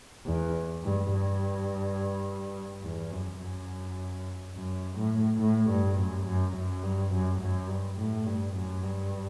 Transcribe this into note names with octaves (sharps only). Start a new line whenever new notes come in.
E2
G2
G2
E2
F#2
F#2
F#2
A2
A2
G2
F#2
F#2
F#2
G2
F#2
F#2
G2
A2
G2
F#2
G2